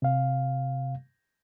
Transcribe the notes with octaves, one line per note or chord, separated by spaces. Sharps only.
C3 F5